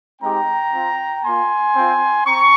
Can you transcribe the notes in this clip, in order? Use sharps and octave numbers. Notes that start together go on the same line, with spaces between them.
G#3 C4 D#4 G4 G5 A#5
C4 F4
A#3 F4 G#5 C6
C4 F4
C4 A#5 C#6